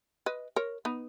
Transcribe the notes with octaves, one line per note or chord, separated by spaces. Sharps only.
B4 D#5
A#4 C#5
B3 D#4